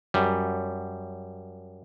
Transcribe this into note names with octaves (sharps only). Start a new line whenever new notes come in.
F#2 G3